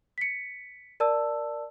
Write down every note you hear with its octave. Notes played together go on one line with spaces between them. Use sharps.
B6 C#7
A#4 D5 A5 E6